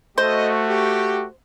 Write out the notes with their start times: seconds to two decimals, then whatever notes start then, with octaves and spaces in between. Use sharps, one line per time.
0.18 A3 F#4 A4 C5 D#5
0.68 G4